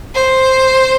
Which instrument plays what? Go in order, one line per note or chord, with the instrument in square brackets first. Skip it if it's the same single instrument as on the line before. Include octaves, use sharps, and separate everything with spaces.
[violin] C5